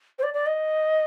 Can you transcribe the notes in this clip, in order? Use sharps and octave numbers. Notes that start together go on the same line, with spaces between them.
C5
D5
D5
D#5